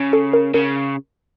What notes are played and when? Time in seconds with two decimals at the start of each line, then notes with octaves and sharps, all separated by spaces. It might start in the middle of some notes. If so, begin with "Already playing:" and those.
Already playing: C#3
0.13 A4
0.33 A#4
0.54 C#3 A#4